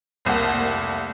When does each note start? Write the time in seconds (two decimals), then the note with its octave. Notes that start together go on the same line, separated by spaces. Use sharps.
0.25 F1 C2 A#3 F#5